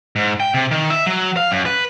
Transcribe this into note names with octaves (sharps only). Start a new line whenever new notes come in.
G#2
G5
C3
D#3
E5
F#3
F5
F#2
B4